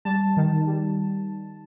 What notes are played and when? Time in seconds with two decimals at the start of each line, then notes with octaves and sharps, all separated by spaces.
0.05 G3 A5
0.37 D#3
0.67 G3